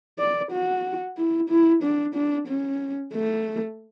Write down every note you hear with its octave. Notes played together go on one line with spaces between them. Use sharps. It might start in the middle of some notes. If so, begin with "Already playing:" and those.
D5
F#4
E4
E4
D4
D4
C#4
A3